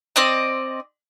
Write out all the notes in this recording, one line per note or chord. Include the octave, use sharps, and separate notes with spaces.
C4 D5 D#5